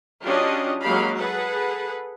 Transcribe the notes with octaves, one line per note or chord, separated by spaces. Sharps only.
F#3 C#4 D4 F4 G4 D#5
F#3 G#3 A#3 G4 F5 B5
G#4 A4 B4 F#5